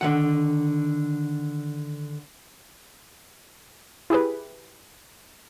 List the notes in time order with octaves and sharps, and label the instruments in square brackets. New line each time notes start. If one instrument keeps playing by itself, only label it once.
[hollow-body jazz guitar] D3 D#3 F#5
[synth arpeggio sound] E4 G4 G#4 B4